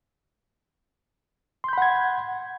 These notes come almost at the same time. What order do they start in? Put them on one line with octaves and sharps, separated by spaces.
C6 G6 B5 F#5 G#6